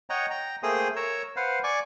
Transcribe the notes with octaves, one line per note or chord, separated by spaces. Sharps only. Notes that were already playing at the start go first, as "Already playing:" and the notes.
C#5 D#5 F#5 G5 A#5
G5 A#5
A3 A#3 G#4 C5 G5 D#6
A#4 C#5 E6
B4 C5 F5 F#5
D5 G#5 C#6 D6